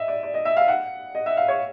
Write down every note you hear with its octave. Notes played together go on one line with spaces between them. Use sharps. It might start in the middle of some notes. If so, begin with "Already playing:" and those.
Already playing: D#5 E5
D5
D5
D#5
E5
F5
F#5
D#5
E5
F5
C#5